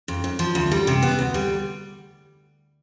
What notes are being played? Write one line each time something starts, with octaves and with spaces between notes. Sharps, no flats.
F2
F2
F3
D2
G3
C3
B3
D2
G3